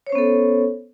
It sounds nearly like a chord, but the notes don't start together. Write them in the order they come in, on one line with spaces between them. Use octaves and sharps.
C#5 C5 C#4 B3 A4